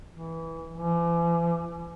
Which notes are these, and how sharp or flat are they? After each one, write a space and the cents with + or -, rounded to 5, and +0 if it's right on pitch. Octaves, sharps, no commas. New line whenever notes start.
E3 -10
E3 +45